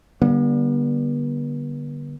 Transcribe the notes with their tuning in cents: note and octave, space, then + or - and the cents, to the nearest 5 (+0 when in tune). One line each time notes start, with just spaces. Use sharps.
D3 +5 G3 -5 B3 -45